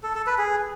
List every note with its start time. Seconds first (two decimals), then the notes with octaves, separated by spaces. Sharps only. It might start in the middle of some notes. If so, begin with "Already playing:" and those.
0.03 A4
0.15 A4
0.27 B4
0.38 G#4